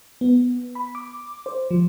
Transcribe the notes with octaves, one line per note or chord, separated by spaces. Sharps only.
B3
B5
D6
C5
F3